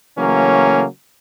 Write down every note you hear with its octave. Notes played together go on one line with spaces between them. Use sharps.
C#3 E3 F#3 A3 A#3 C#4